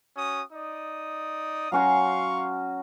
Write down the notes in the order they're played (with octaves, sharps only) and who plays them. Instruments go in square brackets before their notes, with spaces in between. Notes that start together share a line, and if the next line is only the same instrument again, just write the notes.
[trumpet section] C#4 F#4 D#6
D#4 D5 D#6
[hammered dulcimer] F#3 C#4 F#4 [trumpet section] F5 C6 C#6